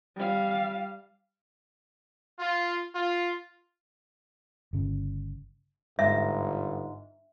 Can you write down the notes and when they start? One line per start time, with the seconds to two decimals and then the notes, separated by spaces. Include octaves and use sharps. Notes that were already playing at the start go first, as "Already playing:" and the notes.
0.17 G3 F5
2.40 F4
2.94 F4
4.73 G1 C#3
5.99 G1 G#2 E5